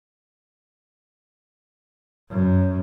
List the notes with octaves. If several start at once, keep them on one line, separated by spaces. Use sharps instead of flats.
F#2